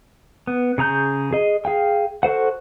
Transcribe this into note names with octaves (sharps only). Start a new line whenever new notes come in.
B3
C#3 G#4 A#5 G6
G#4 D#5
G#4 F5 G5
F#4 A4 C5 F#5